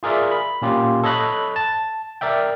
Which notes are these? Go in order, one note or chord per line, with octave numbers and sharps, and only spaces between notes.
F4 G#4 A#4 D5 E5
B5
A#2 A#3 C#4 F4 G4
A4 C#5 D#5 B5 F#6
A5
A#4 D5 E5 G5